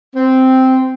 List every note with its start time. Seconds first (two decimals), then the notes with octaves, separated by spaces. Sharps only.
0.15 C4